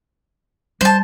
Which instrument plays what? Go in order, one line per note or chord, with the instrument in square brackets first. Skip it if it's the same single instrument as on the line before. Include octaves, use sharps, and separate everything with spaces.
[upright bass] G3 [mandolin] C5 A5